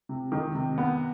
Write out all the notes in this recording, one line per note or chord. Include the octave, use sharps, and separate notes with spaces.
C3
D#3
C3
B3